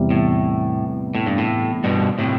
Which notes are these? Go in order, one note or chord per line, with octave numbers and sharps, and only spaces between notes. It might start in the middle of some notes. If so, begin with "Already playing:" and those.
Already playing: E2 C3 G3
A2
A2
G2
A2
G2 B2
A2 C3